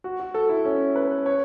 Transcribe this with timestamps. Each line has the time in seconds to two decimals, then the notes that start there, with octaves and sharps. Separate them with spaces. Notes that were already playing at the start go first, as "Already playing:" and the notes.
0.04 F#4
0.20 F#4
0.34 A4
0.49 E4
0.65 C#4
0.96 B4
1.26 C#5